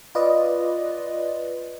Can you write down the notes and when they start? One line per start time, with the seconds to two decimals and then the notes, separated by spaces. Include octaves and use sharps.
0.15 F4 B4 D5 D#5